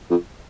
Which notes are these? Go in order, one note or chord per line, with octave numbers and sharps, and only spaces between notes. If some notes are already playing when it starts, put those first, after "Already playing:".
F2